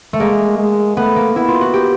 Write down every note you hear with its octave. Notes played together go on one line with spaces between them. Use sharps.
A3
G#3 A#3
G#3
A3 B3
A#3
B3 E4
F4
F#4
G4